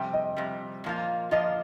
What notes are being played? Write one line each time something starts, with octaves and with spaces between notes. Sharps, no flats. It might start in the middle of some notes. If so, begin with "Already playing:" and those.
Already playing: F2 C3 G3 G5
D#5
F2 C3 G3
A#2 F3 A#3 F4
A#2 F3 A#3 F4 D#5